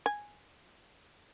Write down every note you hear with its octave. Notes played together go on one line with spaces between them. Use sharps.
G#5